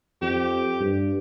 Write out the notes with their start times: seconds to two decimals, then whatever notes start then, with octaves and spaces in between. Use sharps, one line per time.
0.21 F2 G4
0.80 G2